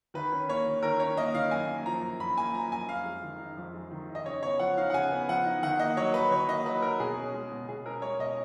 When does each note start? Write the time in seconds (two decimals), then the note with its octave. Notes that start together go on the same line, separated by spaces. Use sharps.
0.14 D#3 B4
0.32 C#4
0.49 A#3 C#5
0.65 D#3
0.83 D#3 A#4
1.00 C#4 C#5
1.17 A#3 D#5
1.34 D#3 F5
1.51 F#2 G#5
1.68 A#3
1.86 F3 A#5
2.03 F#2
2.20 F#2 B5
2.37 A#3 G#5
2.54 F3 A#5
2.71 F#2 G#5
2.89 F2 F5
3.05 G#3
3.23 D#3
3.39 D#4
3.57 F2
3.74 G#3
3.91 D#3
4.09 D#4
4.15 D#5
4.26 C#3 C#5
4.42 B3 C#5
4.59 F3 F#5
4.77 D#4 F5
4.90 F#5
4.94 C#3 G#5
5.12 B3
5.29 F3 F#5
5.45 D#4
5.63 D#3 F#5
5.79 A#3 D#5
5.97 F#3 C#5
6.14 D#4 B4
6.31 D#3 C#5
6.48 A#3 D#5
6.65 F#3 B4
6.82 D#4 A#4
7.00 B2 G#4
7.17 C#4
7.34 G#3
7.52 B2
7.68 B2 G#4
7.86 C#4 A#4
8.02 G#3 C#5
8.19 B2 D#5